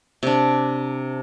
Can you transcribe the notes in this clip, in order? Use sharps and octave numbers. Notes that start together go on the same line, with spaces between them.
C3 D4